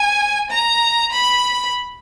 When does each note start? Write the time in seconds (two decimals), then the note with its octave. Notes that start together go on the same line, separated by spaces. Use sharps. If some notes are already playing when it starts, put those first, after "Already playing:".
Already playing: G#5
0.51 A#5
1.12 B5